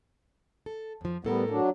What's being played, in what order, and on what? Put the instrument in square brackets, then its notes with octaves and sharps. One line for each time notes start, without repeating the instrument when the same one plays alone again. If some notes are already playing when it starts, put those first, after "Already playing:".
[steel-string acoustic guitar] A4
F2 F3
[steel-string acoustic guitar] A2 A4 A#4 [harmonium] G3 B3
[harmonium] F#3 D4